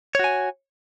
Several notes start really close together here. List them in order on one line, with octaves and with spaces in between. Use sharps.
C#5 F#4 G#5